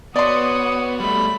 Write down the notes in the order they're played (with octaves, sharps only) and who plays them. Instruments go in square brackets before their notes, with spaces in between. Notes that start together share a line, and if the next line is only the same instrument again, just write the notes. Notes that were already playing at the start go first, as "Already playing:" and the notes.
[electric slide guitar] B3 [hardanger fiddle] F#4 C#5 [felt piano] D5 C6 [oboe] D#6
[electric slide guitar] G3 A3 [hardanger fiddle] B5